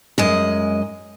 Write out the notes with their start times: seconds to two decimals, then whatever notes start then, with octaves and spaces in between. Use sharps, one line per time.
0.18 F#2 G#3 D#5